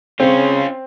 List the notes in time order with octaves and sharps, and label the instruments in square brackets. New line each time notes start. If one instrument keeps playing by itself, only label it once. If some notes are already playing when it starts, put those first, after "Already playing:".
[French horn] C#3 [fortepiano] C4 [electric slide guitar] C#4 F4